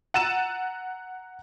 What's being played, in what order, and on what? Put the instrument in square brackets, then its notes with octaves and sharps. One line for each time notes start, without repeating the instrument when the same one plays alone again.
[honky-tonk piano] F#5 A#5 E6 A6 D#7 E7